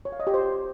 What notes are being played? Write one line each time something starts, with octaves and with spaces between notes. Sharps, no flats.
C#5
F5
D#5
G4
C5